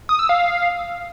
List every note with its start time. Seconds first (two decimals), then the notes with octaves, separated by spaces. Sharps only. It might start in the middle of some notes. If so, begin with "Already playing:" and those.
0.09 D#6
0.19 E6
0.29 F5